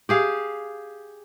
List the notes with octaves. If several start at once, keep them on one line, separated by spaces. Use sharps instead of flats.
G4 G#4 F5